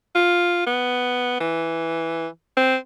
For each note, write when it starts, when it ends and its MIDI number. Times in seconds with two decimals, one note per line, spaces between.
0.15 0.64 65
0.66 1.35 59
1.40 2.27 52
2.56 2.76 60